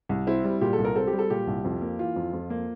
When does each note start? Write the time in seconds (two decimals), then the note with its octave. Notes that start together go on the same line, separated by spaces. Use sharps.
0.09 C2
0.27 C4 E4
0.44 G3
0.61 A#2 G4
0.73 A4
0.79 C2
0.85 A#4
0.95 C4 A4
1.07 G4
1.13 G3
1.19 A4
1.30 A#2 G4
1.47 C2
1.64 F2
1.82 A#3
1.99 E3 F4
2.16 F2
2.33 F2
2.50 A#3